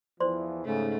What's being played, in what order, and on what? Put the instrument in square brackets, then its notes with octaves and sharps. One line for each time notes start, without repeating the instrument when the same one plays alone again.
[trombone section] E2 E3 F3 [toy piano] C5 D5 C6
[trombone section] G#2 C#3 [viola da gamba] A3